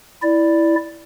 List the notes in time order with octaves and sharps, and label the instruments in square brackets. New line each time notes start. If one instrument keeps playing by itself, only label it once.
[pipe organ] E4 D5